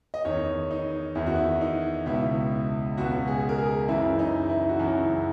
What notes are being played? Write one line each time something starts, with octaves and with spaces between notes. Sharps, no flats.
D#5
E2 D#3 C#5
D#4
E2 D#3 E4
F#4
E4
D#4
C#2 B2 E4
C#2 B2 F#4
G#4
A#4
G#4
F#2 C#3 E3 E4
D#4
E4
F#4
F#2 C#3 E3 E4